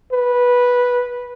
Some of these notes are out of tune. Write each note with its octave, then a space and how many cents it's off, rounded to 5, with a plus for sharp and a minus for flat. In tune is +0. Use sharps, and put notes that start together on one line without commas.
B4 -10